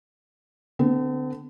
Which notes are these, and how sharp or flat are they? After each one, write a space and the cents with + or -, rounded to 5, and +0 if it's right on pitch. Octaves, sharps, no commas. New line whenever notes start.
D3 +0 C4 -45